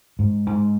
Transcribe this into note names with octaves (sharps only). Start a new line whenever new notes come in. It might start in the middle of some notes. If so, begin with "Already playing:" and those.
G#2
G#2